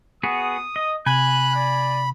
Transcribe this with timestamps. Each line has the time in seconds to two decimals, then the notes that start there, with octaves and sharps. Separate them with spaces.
0.23 B3 F#4 G#4 D#6
0.76 D#5
1.06 C3 G#5 B5 F#6
1.55 D5